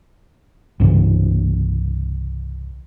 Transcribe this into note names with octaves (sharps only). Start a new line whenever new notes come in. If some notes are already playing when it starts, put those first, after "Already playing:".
C2 G2 C#3 E3